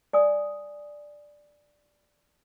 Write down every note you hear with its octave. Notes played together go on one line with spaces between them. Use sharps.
D5 G#5 D#6